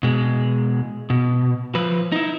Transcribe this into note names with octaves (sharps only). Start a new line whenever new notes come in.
B2 G#3
B2
F3 B4
D#4 E4